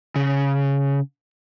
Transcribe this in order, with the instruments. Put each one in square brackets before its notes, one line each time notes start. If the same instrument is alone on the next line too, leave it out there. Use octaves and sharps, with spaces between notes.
[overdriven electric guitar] C#3